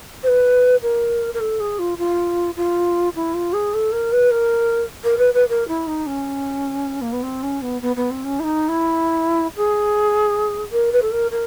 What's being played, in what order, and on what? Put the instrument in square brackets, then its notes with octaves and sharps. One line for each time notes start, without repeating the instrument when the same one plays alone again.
[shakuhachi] C5
B4
A#4
A#4
A4
G#4
F4
F4
F4
E4
F4
G#4
A4
A#4
B4
A#4
A#4
B4
B4
A#4
E4
D#4
C#4
A#3
B3
C4
C#4
B3
B3
B3
C4
C#4
E4
D#4
E4
G#4
A#4
B4
A4
A#4
A#4